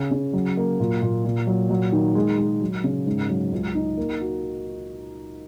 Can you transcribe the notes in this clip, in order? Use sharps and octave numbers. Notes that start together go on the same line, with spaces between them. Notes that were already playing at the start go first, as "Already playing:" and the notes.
Already playing: C#3
C#3
F#3
A#3
A#2
A#2
A#2
F#3
F#3
D#3
G#3
G#3
F#3
C#3
G#2
F#3
C#2
D#4
A#3
F#4